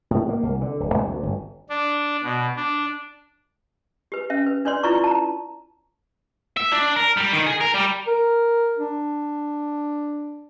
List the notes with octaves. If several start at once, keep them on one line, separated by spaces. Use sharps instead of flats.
A2
A#3
C2
D3
D1
C2
D2
G1
D4
B2
D4
G4 B4
C#4 E5
B4
D4 B4 C#5 D5 C6
E4 F4 B4 D5 A#5 C#6
A5 A#5
E5
D4
A#4
G3
D#3
G#4
A#4
G3
A#4
D4